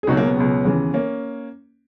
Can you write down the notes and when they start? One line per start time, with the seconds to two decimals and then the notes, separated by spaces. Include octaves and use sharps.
0.03 G#4
0.07 C#2 B2 F#3 D#4 F#4
0.17 A#3
0.27 B3
0.37 C#2 B2 F#3
0.65 D#2 C#3 E3
0.94 A#3 C#4